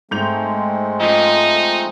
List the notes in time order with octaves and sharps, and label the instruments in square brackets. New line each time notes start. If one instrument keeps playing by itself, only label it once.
[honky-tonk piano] G#2 G6 F7 [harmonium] G#3 A3 C4
[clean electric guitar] F3 D#5 [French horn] D#4